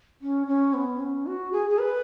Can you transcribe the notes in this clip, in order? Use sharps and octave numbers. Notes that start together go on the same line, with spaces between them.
C#4
C#4
B3
C#4
F#4
G#4
G#4
B4